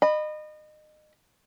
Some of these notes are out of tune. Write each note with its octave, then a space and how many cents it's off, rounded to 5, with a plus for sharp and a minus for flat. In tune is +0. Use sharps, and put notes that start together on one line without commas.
D#5 -30 B5 +0